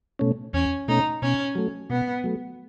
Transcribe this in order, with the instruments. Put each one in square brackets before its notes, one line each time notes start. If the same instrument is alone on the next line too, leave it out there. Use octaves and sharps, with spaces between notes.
[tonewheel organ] B2 A3 C#4
[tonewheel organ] E2 [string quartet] C#4
[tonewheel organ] B2 A3 C#4 [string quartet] D#4
[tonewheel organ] B2 [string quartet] C#4
[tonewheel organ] F#3 A3
[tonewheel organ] B2 [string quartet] B3
[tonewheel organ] F#3 A3